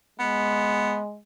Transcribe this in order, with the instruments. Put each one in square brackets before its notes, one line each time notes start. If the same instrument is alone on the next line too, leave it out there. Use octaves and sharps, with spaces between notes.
[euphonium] G#3 [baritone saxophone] B3